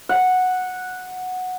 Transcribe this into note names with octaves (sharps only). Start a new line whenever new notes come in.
F#5